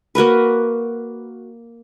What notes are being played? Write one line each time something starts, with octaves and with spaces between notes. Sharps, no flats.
A#3 F#4 A#4 B4